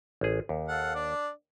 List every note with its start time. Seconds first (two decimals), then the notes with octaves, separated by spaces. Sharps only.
0.21 A1 G#4
0.49 D#2
0.68 A4 F5 F#5
0.95 D4 D5